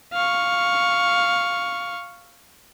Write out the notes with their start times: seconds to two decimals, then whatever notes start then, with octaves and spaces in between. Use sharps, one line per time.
0.13 F5 C#6